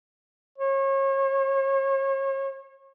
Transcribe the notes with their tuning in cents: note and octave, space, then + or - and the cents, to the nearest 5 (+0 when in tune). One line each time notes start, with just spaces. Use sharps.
C#5 -35